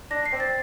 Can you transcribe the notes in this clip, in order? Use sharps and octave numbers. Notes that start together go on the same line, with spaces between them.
D4 A#6
C7
C4
A6